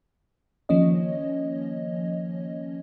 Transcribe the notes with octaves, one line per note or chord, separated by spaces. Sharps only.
D#3 F3 A#3 C#4 C#5 D#5